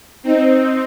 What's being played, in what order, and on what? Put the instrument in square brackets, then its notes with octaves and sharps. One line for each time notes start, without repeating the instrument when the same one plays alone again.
[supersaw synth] C4 D#4